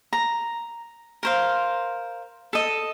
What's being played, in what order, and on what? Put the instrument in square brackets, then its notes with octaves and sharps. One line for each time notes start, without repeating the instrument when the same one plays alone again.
[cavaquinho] A#5
A#4 C5 F5
A4 D#5